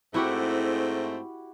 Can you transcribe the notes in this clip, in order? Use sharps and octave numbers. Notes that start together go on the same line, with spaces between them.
G#2 A3 C4 E4 F#4 G4